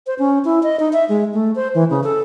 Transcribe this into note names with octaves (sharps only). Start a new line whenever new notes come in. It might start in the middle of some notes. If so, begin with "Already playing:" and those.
C5
C#4
E4
D#5
D#4
E5
G#3
A3
C5
E3
C#3
A4